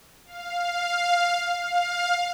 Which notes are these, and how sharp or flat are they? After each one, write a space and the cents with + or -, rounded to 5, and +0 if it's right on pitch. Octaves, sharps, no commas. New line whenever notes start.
F5 +5
F5 +15